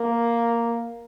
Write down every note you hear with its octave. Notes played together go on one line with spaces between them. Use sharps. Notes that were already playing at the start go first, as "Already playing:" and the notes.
Already playing: A#3